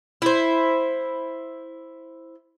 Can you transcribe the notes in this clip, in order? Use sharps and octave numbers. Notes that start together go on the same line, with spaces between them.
E4 C5